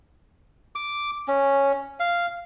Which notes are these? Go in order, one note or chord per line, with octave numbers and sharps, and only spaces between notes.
D6
C#4
F5